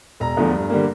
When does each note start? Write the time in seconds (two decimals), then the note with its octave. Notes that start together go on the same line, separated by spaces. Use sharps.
0.20 E1 A#5
0.37 E2 D3 F3 A3
0.53 G2
0.70 D3 G3 A#3